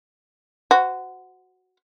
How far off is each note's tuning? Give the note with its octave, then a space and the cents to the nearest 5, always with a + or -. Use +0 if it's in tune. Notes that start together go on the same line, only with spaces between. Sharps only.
F#4 +0 C5 -30